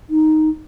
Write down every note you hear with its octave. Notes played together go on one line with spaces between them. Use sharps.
D#4